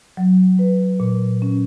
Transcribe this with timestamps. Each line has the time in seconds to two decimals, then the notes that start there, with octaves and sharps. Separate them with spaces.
0.17 F#3
0.59 B4
1.00 A#2
1.42 C#4